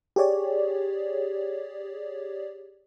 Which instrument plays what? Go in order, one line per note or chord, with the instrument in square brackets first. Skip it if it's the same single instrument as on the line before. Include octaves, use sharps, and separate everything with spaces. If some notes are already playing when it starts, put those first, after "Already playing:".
[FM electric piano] G4 G#4 C#5 D5